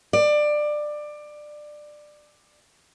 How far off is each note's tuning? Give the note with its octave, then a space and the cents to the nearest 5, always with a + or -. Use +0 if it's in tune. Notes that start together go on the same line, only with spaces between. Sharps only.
D5 +20